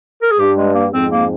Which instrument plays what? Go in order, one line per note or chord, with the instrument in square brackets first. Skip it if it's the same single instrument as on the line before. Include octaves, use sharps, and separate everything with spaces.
[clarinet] A#4
G#4
[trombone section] G2 [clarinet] G4
[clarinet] G#3
A#3
[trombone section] F2 G#2 [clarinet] C4
[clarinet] A#3